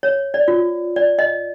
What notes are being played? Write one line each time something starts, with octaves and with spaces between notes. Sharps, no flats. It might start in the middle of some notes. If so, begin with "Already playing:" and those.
C#5
D5
F4
D5
D#5